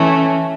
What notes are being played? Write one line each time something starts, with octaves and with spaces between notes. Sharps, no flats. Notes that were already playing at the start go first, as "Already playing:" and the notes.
Already playing: E3 A3 C#4